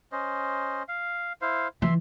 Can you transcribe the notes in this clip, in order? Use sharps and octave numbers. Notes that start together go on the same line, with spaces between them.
C#4 C5 D#5
F5
E4 C5 F5
E3 E5 C6